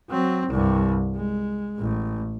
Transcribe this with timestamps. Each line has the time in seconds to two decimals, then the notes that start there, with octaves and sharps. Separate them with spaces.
0.10 F#3 C4
0.49 C2 G2
1.16 G#3
1.79 A1